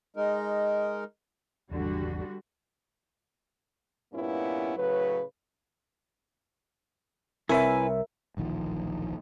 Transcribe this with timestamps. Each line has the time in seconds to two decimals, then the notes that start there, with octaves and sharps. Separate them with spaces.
0.16 G#3 D#4 A#4
1.71 G#1 E2 D3 G3 F#4
4.13 G2 A#2 A#3 B3 C#4 E4
4.76 A2 C#3 F#3 B4
7.49 C2 C4 E4 A#4 B4 C#5 E5 G#5
8.37 D1 A#1 D#3 F3